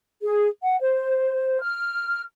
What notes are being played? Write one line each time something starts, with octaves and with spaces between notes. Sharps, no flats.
G#4
F#5
C5
F6